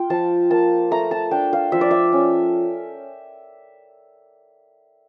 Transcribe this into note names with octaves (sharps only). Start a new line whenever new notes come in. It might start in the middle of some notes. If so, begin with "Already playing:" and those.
Already playing: F4 G5
F3 A5
A#3 A5
A3 A#5
A5
D4 G5
F5
F3 E5
D5
E5
C#4